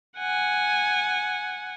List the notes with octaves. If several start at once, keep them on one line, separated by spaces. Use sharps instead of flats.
F#5 G#5